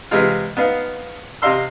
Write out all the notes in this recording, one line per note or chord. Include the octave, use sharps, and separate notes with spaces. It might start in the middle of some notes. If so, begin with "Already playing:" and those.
C3 E3 G#3 F4
B3 D#4 F5
C3 D#5 F5 C6 E6